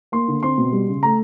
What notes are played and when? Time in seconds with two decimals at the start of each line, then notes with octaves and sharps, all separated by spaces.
0.12 A#3 C6
0.28 D3
0.43 C4 C6
0.58 B2
0.72 G3
0.88 C#3
1.03 A3 A#5